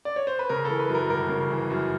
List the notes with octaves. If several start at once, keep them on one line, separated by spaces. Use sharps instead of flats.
D5
C#5
C5
B4
C#3 A#4
A4
E3
B4
F#2
A#4
G1 A#4
C#3
E3
F#2